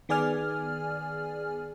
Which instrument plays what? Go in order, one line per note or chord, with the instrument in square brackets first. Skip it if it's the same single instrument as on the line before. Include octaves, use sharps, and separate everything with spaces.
[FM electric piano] D#3 B3 G#4 D5 G#5 F6